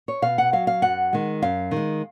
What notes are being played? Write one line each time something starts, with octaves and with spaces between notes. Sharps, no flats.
C#5
B2 F5
F#5
F#3 F5
F5
F#2 F#5
D#3 G#3
F#2 F5
D#3
G#3